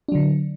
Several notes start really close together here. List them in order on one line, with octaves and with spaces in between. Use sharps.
D4 F#3 D3